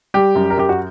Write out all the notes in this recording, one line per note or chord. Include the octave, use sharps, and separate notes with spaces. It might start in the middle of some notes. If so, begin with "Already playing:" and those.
G3 G4
F#2
A#4
F#2 G4
F#4